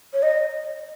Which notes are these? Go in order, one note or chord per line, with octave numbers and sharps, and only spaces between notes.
C#5
D#5